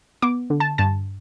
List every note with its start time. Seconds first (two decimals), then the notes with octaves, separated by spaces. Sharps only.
0.22 B3 D6
0.50 D3
0.60 A5
0.78 G2 A5